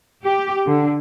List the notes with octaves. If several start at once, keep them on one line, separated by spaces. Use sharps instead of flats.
G4
D3